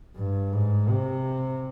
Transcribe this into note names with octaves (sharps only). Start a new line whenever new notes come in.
G2
G#2
C3